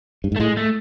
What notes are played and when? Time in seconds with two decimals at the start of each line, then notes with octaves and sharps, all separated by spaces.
0.24 G2
0.32 G#2
0.36 A3
0.40 A2 G#3
0.57 A3